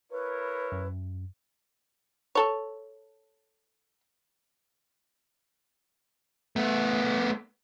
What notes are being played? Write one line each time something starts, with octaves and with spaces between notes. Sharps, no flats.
E4 A#4 B4 C#5
F#2
A4 C#5
A3 B3